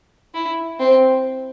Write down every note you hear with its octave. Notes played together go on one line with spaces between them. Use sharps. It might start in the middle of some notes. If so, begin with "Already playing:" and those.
E4
C4